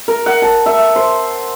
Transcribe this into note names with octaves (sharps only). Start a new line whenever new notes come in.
A#4
F#5
A5
E5
C5